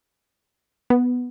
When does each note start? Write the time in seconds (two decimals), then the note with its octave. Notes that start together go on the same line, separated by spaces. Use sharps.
0.90 B3